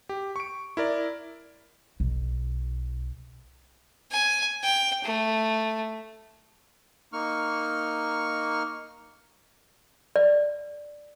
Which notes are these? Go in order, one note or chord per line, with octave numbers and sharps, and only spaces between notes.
G4
C#6 D7
E4 A#4 D5
B1
G#5
G5
A3
A#3 D#4 C#6 F6
D5